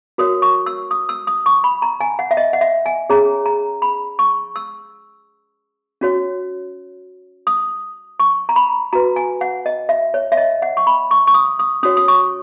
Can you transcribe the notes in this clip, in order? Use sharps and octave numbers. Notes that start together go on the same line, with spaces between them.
F#4 A#4 C#5 D#6
C#6
E6
D#6
E6
D#6
C#6
B5
A#5
G#5
F#5
E5
D#5
F#5
E5
G#5
C#4 G#4 C#5 A#5
A#5
B5
C#6
E6
C#4 F#4 C#5
D#6
C#6
A#5
B5
F#4 B4 A#5
G#5
F#5
D#5
E5
C#5
E5
D#5
F#5
C#6
B5
C#6
C#6
D#6
D#6
C#4 F#4 C#5 D#6
D#6
C#6